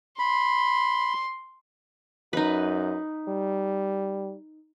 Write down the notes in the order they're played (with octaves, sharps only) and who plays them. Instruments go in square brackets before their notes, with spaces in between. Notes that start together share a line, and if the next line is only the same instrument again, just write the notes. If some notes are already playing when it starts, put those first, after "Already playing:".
[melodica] B5 [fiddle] C6
[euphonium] F#2 [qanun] D#4 B4
[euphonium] G3